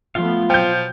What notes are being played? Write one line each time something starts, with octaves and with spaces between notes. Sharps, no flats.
F3 A3 B3 F4 F5
B2 F3 F#3 G5 G6